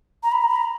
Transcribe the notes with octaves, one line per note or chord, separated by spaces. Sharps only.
A#5
B5
A#5
B5
A#5